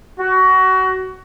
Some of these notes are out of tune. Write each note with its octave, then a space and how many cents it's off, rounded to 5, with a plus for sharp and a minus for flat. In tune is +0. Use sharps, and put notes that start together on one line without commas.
F#4 +20